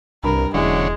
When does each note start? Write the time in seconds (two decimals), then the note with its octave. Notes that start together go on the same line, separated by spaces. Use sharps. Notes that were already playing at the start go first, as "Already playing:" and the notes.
0.24 C2 G2 A#4 B5
0.54 E1 D3 F#3 G#3 C#4 E4